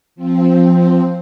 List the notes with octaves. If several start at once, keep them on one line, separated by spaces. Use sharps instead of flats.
F3 C4